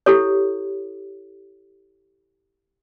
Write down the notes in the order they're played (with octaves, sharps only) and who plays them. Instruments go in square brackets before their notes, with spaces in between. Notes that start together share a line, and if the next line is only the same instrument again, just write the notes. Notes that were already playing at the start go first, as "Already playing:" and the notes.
[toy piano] E4 G4 A4 C#5